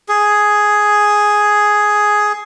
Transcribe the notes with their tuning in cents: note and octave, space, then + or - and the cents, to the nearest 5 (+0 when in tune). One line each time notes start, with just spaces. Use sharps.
G#4 +5